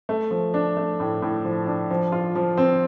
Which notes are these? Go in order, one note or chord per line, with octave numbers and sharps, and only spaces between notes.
A3
F3
D4
A3
A2
A2
F3
D4
F3
F4
F3
C4